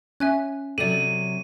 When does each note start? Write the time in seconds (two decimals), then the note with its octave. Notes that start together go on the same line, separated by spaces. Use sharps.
0.20 C#4 E5 G#5 F#6
0.78 C3 F#3 A4 D5 D#7